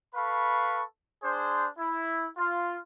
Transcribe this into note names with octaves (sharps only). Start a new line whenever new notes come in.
A4 B4 F5 B5 C#6
D4 G#4 C5
E4
F4